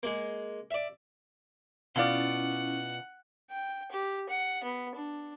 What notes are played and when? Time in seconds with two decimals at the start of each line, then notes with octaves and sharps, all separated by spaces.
0.03 G#3 A#3
0.71 D5 E5
1.96 B2 C#4 E4 F4 D5 F#5
3.50 G5
3.91 G4
4.29 F#5
4.63 B3
4.95 D4